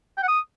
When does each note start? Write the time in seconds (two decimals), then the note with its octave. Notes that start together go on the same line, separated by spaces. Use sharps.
0.17 G5
0.23 F#5
0.28 D#6